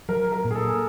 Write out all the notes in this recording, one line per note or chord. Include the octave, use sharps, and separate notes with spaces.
F#3 A#4
A#4
A#2
G#4
A4